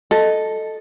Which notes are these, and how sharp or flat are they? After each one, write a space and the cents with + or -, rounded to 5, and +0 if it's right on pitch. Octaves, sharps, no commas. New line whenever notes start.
A4 +0 D#5 +0